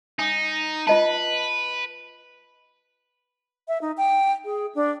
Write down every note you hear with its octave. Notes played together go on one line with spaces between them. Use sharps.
D#4 G#5 D#6
F4 B4 D#5 A5
E5
D#4
G5
G#4
D4